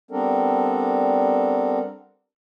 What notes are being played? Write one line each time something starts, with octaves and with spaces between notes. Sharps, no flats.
G3 B3 C4 D4 A4 A#4